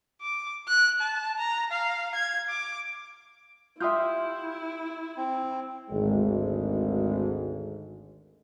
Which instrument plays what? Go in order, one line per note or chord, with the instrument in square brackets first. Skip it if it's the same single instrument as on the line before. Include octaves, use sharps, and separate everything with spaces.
[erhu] D6
F#6
A5
A#5
F5
G#6
D6
[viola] E4 [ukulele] F4 G4 E5 [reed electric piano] C6 D#6 G6
[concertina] C4
[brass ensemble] G#1 D2 G#3